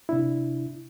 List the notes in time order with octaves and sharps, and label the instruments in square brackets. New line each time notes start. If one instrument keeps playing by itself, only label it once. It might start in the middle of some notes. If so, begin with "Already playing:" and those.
[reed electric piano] C3 D4 E4